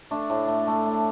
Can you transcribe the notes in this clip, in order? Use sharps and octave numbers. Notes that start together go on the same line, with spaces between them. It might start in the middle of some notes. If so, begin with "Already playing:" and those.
A3 D4
A2
A3
A3
A3